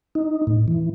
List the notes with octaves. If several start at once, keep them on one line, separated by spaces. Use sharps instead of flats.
D#4
A2
E3